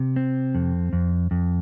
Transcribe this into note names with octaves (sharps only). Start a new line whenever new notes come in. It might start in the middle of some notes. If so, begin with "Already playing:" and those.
Already playing: C3
C4
F2
F2
F2